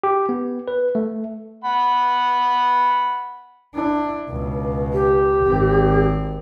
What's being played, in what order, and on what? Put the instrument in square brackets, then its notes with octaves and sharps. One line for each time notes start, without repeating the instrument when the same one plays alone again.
[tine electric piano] G4
B3
B4
A3
[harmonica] F#5 B5
[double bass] D4 E4
C#2 B2
[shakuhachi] G4
[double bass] G#1 C4